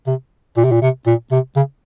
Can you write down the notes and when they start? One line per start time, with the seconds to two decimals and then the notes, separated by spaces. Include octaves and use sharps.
0.07 C3
0.57 A#2
0.65 C3
0.72 A#2
0.82 C3
1.07 A#2
1.32 C3
1.56 C#3